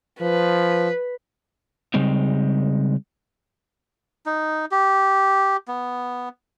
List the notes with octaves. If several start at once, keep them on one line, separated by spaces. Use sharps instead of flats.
F3 B4
C#3 G3 G#3 C4 D#4
D#4
G4
B3